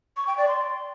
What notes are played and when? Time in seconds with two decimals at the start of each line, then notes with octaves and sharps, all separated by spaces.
0.17 C#6
0.27 G5
0.38 D5
0.48 C6